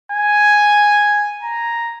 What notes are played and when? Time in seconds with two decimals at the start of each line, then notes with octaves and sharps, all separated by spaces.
0.12 G#5
1.42 A#5